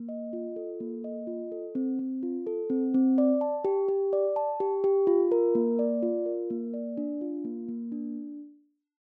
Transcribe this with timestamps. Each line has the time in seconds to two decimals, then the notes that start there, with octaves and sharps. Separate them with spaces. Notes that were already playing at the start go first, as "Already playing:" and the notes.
Already playing: A#3
0.09 D#5
0.33 F4
0.56 A4
0.80 A#3
1.04 D#5
1.27 F4
1.52 A4
1.75 C4
1.99 C4
2.23 F4
2.47 A4
2.70 C4
2.94 C4
3.18 D5
3.41 A5
3.64 G4
3.88 G4
4.13 D5
4.36 A5
4.60 G4
4.84 G4
5.07 F4
5.32 A#4
5.55 A#3
5.79 D5
6.03 F4
6.26 A#4
6.50 A#3
6.74 D5
6.97 D4
7.21 F4
7.45 A#3
7.69 A#3
7.92 D4